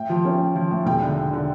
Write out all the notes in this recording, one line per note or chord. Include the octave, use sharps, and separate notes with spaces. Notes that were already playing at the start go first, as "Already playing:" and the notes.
Already playing: A2 G5
F3
C#4
A2
F3
A2
E1 G5
D3
D3
D3